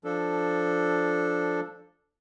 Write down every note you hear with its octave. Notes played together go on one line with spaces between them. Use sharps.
F3 D4 A4